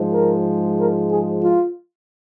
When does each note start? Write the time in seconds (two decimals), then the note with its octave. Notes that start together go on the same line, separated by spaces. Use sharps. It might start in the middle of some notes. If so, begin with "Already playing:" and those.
Already playing: G#2 F3 G#3
0.14 A#4
0.78 A#4
1.11 G#4
1.42 F4